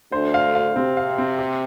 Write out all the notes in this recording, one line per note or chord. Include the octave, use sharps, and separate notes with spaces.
D2 D3 C5
F5
F5
C3 C4
F5
C4
G4